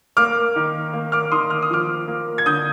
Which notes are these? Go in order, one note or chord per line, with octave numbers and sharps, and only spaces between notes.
A#3 D6 F6
D#3
A#3
D6 F6
D#3 C6 D#6
F6
D#6
F3 D6 F6
A#3
G#6
D3 D#6 G6